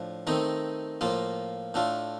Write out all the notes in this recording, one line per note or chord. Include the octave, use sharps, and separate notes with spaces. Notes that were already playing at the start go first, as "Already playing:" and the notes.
Already playing: A2 F3 D4
D#3 A3 C4 D#4
A2 F3 A#3 F4
A2 A3 D4 F4